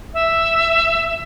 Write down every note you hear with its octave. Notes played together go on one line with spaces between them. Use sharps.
E5